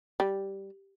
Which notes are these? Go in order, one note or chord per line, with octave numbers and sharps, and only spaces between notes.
G3